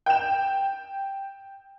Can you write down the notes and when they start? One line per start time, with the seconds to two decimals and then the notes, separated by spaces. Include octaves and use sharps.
0.06 G5 E7